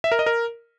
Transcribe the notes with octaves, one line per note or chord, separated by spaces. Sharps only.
E5
A#4
D#5
A#4